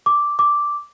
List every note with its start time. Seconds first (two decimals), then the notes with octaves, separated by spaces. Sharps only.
0.06 D6
0.39 D6